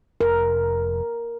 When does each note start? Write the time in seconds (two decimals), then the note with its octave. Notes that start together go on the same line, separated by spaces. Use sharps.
0.21 F1 A#4